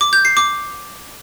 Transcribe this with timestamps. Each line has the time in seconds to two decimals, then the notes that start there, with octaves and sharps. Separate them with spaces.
0.01 D6
0.13 G6
0.25 C7
0.37 D6